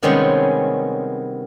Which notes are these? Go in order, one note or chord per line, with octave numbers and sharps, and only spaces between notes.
C3 D#3 G3 G#3 B3 C#4